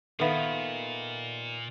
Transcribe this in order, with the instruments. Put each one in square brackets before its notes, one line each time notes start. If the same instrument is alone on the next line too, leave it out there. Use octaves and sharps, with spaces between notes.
[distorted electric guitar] A#2 [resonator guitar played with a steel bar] D#3 B3 [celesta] A4 E5 F5